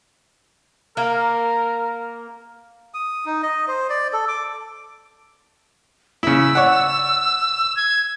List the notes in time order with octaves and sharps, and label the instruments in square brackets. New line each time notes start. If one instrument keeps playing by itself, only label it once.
[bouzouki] A#3 [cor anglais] A#4
[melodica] D#6
D#4
D#5
C5
D5
A4
D6
[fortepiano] C#3 E4 [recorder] E6
[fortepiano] C#5 D5 F#5
[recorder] G#6